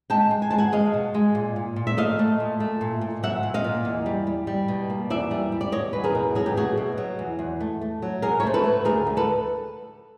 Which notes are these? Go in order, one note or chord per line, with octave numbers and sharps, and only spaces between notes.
G#3 G5 A5
G#3
G#5
G#3 A5
F#5 G#5
G#3 D#5 F5
B2
G#3
A#2
A#2
A#2
E5
A3 D#5 F5
A3
A#2
A3
A#2
A#2
F#3 E5 F#5
A#2
D#5 F5
A#2
E2
G3
G3
G3
B2
A#3
E2 D5 E5
G3
G3
D5
B2 C#5 D#5
E2 B4
G#4 A#4
B2
F#3 G#4
G4
A3 F#4 G#4
B2
F#3
E2
E2
A3
A3
F#3
B2 G#4 A#4
C#5
A3 C5
A4 B4
A3
D2 G#4 A#4
D2
A4 B4